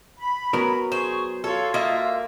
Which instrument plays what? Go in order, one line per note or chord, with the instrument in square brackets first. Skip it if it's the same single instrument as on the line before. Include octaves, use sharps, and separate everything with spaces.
[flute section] B5
[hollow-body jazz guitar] F#3 B3 A#4 [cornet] C#4
[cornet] G#4 [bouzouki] C5 [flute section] C#6
[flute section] F4 F#4 [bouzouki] A4 [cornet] C#5
[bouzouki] A#3 [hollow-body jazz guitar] D#5 [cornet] E5